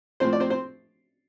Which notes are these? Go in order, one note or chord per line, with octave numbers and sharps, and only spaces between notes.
A2 F3 C4 C5
D5
C4 C5
C4 C5